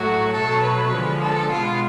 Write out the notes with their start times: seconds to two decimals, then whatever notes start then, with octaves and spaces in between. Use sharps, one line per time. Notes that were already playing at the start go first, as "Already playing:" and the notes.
Already playing: A2 F#3 A3 F#4
0.32 B2 F#3 A3 A4
0.62 B4
0.91 D3 F3 G#3
1.22 A4
1.51 B2 G#3 B3 F4